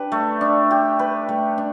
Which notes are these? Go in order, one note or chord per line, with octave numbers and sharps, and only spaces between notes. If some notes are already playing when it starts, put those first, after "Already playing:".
Already playing: D4 G4 B4
A3
D4
G4
B4
A3
D4